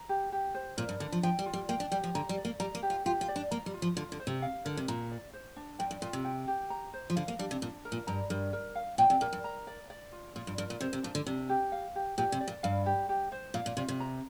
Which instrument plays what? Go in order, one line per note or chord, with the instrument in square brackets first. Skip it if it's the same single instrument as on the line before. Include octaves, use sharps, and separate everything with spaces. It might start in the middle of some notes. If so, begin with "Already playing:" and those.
Already playing: [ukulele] A#5
G4
G4
C5
[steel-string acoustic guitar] A#2 [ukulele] A#4
[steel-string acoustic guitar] G2
[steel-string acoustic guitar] D3 [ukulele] D4
[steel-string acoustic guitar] F3
[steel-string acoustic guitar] F3 [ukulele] G5
[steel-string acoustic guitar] G3
[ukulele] F4
[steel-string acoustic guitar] G3
[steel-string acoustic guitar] A#3 [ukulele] G5
[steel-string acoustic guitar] D4
[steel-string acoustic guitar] G3 [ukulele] G4
[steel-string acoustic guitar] F3
[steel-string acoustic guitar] D3 [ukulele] A#5
[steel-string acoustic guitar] G3
[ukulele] D5
[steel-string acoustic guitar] A#3
[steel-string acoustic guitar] G3 [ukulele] A#5
[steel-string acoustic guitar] A#3
[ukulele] G4
[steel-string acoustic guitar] F4
[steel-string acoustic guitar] F4 [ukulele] G4
[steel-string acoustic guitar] F4
[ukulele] D5
[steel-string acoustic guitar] D4
[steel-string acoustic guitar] A#3 [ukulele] A#5
[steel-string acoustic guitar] G3
[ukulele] F4
[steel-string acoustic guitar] F3
[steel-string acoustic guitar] D3 [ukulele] F4
[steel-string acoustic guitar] D3
[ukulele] C5
[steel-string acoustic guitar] C3
[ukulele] F5
[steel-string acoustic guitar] D3 [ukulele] A#4
[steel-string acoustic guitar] C3
[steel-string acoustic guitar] A#2 [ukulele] A#5
[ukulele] D5
C5
D4
[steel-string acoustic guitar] G2 [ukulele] G5
[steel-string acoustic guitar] G2
[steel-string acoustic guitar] A#2 [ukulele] F4
[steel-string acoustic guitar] C3
[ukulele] G5
G4
A#5
C5
[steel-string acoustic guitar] F3
[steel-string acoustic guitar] D3 [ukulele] F5
[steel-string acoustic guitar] A#3
[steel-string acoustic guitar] G3 [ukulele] D4
[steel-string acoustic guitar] C3
[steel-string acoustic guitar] A#2 [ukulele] D4
[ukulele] A#4
[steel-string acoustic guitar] A#2
[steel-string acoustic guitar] G2 [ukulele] A#5
[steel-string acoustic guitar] G2 [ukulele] A#4
[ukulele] A#4
F5
[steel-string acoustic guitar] A#2 [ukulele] G5
[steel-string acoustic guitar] C3
[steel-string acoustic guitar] A#2 [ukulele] A#4
[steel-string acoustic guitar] G2
[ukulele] A#5
D5
D5
F4
[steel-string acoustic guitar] A#2 [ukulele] F4
[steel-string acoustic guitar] G2
[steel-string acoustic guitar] G2 [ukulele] A#4
[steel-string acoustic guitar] A#2
[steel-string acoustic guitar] C3 [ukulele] C5
[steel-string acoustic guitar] C3
[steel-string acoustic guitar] A#2 [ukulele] D4
[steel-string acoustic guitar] D3
[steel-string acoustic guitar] C3 [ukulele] D4
[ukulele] G4
F5
G4
[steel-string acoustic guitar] A#2 [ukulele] G4
[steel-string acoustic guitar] C3
[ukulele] D5
[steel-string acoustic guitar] A#2
[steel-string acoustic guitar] G2 [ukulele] F5
[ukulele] G4
G4
C5
[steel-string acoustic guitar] A#2 [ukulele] F5
[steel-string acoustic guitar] A#2
[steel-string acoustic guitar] C3 [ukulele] F4
[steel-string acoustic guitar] C3
[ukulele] A#5